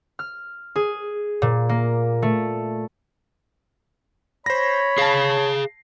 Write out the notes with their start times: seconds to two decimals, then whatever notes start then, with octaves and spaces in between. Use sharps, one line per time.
0.19 F6
0.76 G#4
1.42 A#2
1.69 A#3
2.22 A3
4.46 C5 C#5 B5 A#6
4.98 G#4 F5 A5 C7